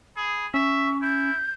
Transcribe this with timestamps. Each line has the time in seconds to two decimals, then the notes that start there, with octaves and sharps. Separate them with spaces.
0.17 G#4 B5
0.54 C#4 E5 C#6
1.02 E4 G6